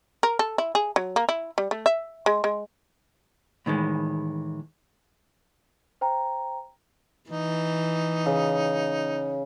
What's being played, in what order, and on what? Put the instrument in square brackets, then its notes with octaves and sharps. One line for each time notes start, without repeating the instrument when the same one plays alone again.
[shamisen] A#4
A4
E4
G#4
F#3
A#3
E4
G3
A3
E5
G#3
G#3
[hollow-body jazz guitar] A2 D#3 E3 G#3
[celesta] C5 G5 A#5
[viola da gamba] E3 [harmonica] D#4
[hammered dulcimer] C#3